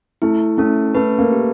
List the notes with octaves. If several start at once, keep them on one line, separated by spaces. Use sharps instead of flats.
A3 E4
A3 C#4
A3 B4
A#3
G4